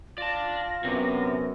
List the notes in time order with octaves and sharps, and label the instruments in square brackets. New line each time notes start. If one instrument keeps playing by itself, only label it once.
[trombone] F4 [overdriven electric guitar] D5 A5 [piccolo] A#6
[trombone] F#2 [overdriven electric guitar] C3 [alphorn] B3